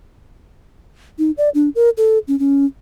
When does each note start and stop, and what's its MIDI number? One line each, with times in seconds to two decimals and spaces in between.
1.19 1.31 63
1.38 1.49 74
1.54 1.69 62
1.75 1.90 70
1.97 2.19 69
2.28 2.38 61
2.39 2.65 61